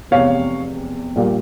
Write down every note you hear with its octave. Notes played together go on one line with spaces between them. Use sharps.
F1 E2 C3 C#5 F5
A#1 A#2 G3 A#3